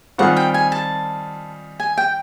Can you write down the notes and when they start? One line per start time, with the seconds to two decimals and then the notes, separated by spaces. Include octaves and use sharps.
0.18 D#3 G3 C4 F4 G#4 F#5
0.36 G5
0.54 G#5
0.72 A5
1.80 G#5
1.98 G5